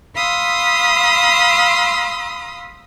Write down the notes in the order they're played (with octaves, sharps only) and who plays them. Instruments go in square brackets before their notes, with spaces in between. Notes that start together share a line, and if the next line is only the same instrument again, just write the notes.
[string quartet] F5 B5 C6 D#6 E6